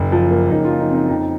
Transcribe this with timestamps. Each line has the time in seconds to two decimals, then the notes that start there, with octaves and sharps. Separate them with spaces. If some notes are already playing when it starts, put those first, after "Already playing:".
Already playing: F#1 D#4
0.12 F3
0.31 A#3
0.50 F#1 D#4
0.65 F4
0.71 F3
0.79 D#4
0.90 C4 D#4
1.09 F2 D#4